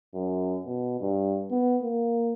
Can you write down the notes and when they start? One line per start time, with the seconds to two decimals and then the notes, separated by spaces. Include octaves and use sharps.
0.14 F#2
0.65 B2
1.00 G2
1.51 B3
1.82 A#3